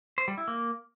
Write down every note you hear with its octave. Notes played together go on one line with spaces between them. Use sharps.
C5
G3
E4
A#3